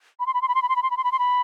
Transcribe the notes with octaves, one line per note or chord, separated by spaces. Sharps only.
B5
C6
B5
C6
B5
C6
B5
C6
B5
C6
B5
C6
B5
C6
B5